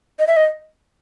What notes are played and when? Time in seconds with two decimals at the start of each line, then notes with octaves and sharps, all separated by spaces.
0.19 D#5
0.27 E5
0.37 D#5